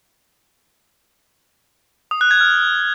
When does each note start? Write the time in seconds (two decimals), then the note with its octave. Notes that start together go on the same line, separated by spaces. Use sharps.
2.11 D#6
2.21 F#6
2.31 G#6
2.41 F6